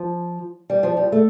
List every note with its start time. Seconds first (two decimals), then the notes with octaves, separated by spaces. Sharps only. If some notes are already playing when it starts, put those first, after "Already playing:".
Already playing: F3
0.70 G3
0.83 F3
0.97 G3
1.12 A3